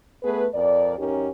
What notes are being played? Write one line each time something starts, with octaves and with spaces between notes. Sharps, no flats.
A3 B3 G#4 B4
F2 A#4 D5
F#2 C#4 D#4 G4 A#4